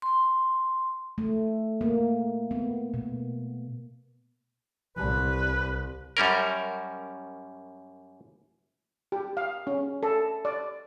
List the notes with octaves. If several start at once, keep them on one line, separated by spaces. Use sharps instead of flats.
C6
A3
A#3
B3
B2
C2 B4
F#2 G3 C#4 A#4
G4
F5
C#4
A4
D5